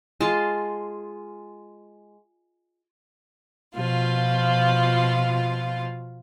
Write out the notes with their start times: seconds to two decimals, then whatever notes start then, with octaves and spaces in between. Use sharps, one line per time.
0.21 G#3 F4 A5
3.75 B2 F3 F4